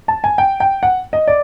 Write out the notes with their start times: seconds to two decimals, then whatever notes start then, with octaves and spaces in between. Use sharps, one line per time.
0.08 A5
0.24 G#5
0.38 G5
0.60 G5
0.83 F#5
1.13 D#5
1.27 D5